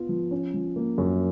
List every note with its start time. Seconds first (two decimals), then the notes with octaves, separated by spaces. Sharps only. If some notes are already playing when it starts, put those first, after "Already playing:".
Already playing: B3 F4
0.09 F3
0.31 C#4
0.54 F3
0.76 A#3
0.98 F#2